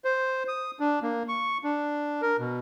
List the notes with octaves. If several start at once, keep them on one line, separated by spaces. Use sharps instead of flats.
C5
D#6
D4
A#3
C#6
D4
A#4
B2